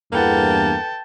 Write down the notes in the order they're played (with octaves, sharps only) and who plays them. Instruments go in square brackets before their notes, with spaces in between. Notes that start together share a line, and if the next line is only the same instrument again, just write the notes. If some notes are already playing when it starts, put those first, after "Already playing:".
[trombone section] E2 G2 [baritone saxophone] A#3 [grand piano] A4 B4 F#5 [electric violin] G5 A5